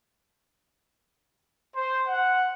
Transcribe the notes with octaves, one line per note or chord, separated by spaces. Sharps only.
C5
F#5